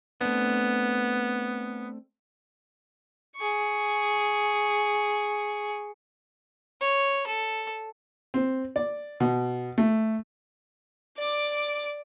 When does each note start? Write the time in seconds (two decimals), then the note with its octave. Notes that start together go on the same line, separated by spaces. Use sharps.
0.21 A3 B3 C4 D4
3.36 G#4 C#6
6.81 C#5
7.27 A4
8.34 C4
8.76 D5
9.20 B2
9.78 A3
11.17 D5 D6